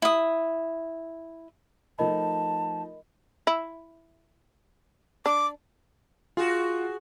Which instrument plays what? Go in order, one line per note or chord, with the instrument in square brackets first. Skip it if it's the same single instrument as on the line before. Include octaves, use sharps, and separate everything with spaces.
[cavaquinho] E4 D#6
[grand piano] F3 A3 D#4 [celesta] A#4 D#5 B5 [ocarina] A5
[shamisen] E4
[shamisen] D4 [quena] D6
[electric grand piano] F4 [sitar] F#4 G#4